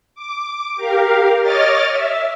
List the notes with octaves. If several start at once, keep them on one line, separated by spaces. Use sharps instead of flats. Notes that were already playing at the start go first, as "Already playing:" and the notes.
D6
G4 A#4 F5
C#5 D#5 D6 F6 A6
E5